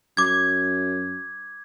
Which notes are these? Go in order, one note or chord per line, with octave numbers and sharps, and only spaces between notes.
F#2 D6 G#6